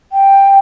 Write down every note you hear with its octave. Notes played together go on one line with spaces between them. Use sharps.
G5